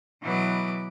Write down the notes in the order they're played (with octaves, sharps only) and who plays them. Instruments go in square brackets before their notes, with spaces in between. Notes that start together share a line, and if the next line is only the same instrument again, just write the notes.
[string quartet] B2 E3 F#3 B4 D#5 D6